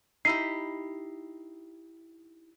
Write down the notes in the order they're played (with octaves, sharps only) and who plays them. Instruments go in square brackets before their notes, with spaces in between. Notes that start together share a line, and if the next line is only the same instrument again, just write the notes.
[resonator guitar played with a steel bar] D#4 E4 G4 [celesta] C7